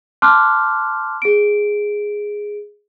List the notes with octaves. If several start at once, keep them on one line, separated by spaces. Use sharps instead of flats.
A5 C6 D6 F6 F#6
G#4 D7